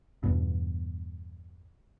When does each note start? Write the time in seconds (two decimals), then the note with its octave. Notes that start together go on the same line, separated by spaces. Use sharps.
0.23 E2 G2 B2